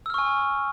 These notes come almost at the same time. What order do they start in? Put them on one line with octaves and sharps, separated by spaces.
E6 F6 C#6 G#5